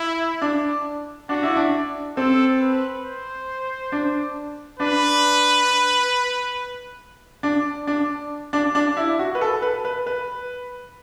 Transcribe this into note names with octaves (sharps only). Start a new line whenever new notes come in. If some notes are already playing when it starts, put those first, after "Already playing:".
Already playing: E4
D4
D4 F#4
E4
D4
C4 A4
B4
C5
D4
D4 B4
D4
D4
D4
D4
E4
F#4
B4
A4
B4
B4
B4